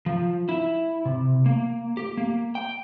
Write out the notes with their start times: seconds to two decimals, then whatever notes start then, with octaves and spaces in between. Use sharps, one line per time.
0.06 F3
0.49 E4
1.05 C3
1.46 A#3
1.97 G4
2.17 A#3
2.55 G5